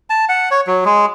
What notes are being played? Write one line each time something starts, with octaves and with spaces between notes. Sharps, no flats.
A5
F#5
C#5
F#3
G#3